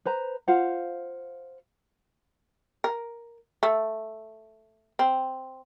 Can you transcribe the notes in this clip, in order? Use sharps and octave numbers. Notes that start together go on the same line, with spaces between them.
B4 C5 A#5
F4 C5 F5 F#5
A#4
A3
C4